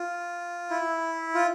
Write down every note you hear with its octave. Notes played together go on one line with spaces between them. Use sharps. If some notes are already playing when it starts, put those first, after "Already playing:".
Already playing: F4
E4
F4